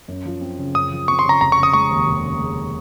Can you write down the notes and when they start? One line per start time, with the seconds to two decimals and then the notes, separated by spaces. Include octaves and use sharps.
0.08 F#2
0.25 F3
0.41 C4
0.58 C#3
0.74 F#2 D#6
0.91 F3
1.08 C4 C#6
1.19 C6
1.25 C#3 A#5
1.41 F1 A#5
1.52 C#6
1.57 C#3
1.63 D#6
1.73 G#3 C#6
1.91 D#2
2.07 F1
2.24 C#3
2.40 G#3